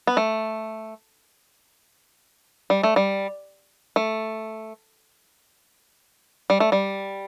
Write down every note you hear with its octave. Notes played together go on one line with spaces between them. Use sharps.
B3
A3
G3
A3
G3
A3
G3
A3
G3